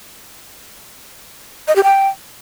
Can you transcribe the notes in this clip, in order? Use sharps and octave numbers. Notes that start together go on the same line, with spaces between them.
D#5
G4
G5